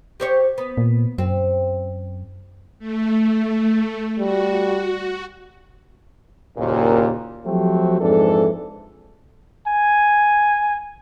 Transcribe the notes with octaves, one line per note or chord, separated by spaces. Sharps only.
G4 C5 C#5
B3
A#2
F#2 C4
A3
G3 F#4
F#1 D#2 A#2
F3 F#3 A3 C4 F#4 G4
F2 G#2 E3 D4 A4
G#5